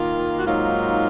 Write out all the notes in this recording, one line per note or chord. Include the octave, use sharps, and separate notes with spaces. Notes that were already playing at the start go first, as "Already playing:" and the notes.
Already playing: D#3 A#3 F4
F#4
G#2 F#3 A#3 D#4 F4